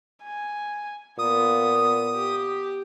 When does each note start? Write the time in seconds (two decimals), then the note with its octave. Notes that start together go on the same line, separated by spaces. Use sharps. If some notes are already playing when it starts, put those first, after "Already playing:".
0.24 G#5
1.19 A#2 B3 D#6
2.15 G4